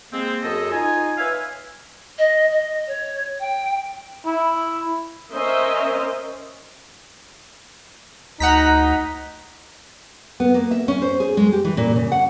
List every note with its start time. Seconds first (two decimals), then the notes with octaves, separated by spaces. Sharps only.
0.12 G#3 A#3 C4
0.43 F#2 G#4 A4 D#5
0.72 D#4 F4 G#5
1.18 B4 C#5 E5 F5 G#5
2.18 D#5
2.51 D#5
2.87 C#5
3.39 G5
4.26 E4
5.33 C#4 A#4 C5 D#5 E5
8.40 D2 D#4 F#5 A#5 B6
10.40 B3
10.54 A#3
10.71 E5
10.88 C#4
11.02 C5
11.20 G#4
11.37 G#3
11.53 G4
11.64 E3
11.77 A#2
11.96 C#3
12.12 F#5